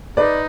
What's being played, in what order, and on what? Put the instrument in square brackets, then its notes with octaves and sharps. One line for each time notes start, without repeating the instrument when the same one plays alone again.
[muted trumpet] D#4 [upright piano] B4 D5